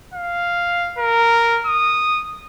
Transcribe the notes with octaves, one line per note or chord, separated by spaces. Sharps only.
F5
A#4
D#6